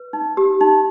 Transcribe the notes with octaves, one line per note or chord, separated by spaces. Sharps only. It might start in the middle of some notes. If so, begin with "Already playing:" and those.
Already playing: B4
D#4
G4
D#4